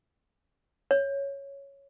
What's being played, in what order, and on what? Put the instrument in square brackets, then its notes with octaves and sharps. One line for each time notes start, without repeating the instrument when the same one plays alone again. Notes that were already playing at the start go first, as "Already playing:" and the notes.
[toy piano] C#5